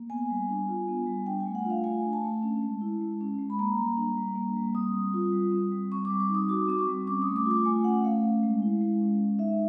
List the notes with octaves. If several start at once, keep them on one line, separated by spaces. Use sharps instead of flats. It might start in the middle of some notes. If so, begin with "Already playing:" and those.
Already playing: A#3
B3 G#5
G3
D4
F4
B3
G3
D4 G5
G#5
A3
F#5
F4
F5
A3 G#5
D4
A5
A3
C#4
G#3
E4
G#3
C#4
G#3
B5
A#3 A#5
G3
D4
G3
A#3
G3
C4 D#6
G3
F4
G3
C4
G3
C4 C#6
G3 D6
D6
D#4
D#6
F#4 D6
C4 D6
C#6
G3
C#4 D6
D#6
A3
D6
F4
D6
A3 G#5
C#4 F#5
A3 F5
C#4
G#3
E4
G#3
C#4
G#3
D#4 E5